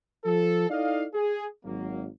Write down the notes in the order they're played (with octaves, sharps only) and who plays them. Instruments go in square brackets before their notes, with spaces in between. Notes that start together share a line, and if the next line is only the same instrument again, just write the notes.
[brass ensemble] F3 A4
D#4 E4 A4 D5 D#5 F5
G#4
G#1 F#3 A#3